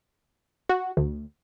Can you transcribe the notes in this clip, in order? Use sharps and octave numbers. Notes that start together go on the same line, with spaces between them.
F#4
D2